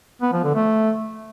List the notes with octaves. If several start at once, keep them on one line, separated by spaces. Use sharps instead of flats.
B3
F3
D3
A3